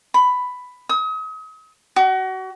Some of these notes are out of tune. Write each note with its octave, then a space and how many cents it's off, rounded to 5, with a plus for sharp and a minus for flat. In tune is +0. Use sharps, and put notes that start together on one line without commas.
B5 +10
D#6 +40
F#4 +30